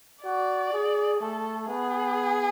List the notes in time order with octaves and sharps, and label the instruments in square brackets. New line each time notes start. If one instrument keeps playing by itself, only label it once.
[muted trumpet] F#4 [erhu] D5
[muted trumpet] G#4
[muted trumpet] A3 [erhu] A4
[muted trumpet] B3 [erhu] G#4